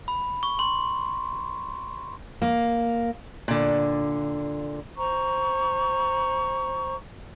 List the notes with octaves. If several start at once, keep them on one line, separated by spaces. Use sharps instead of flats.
B5
C#6
C6
A#3
A#2 D3
C5 A#5 C#6